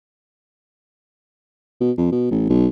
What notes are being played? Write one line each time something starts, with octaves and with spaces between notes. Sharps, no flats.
B2
F2
B2
A1
B1